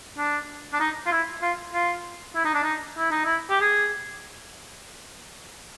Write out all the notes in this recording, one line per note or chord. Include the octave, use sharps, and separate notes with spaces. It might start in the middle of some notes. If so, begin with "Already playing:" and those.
D4
D4
D#4
F4
E4
F4
F4
E4
D#4
D4
D#4
E4
D#4
E4
G4
G#4